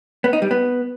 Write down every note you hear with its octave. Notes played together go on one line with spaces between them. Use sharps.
B3
D#4
G3
B3